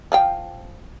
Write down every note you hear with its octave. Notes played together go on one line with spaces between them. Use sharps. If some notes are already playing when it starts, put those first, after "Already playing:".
F3 F5 G5